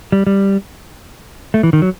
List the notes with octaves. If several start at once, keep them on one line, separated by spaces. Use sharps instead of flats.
G3
G3
A3
E3
D#3
F#3